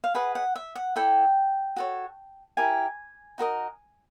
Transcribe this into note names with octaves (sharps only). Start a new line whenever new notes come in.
F5
G#4 B4 D#5 F#5
F#5
E5
F#5
E4 A4 D5 G5
F#4 A4 C#5
E4 G4 A#4 G#5
D#4 F#4 A#4 D#5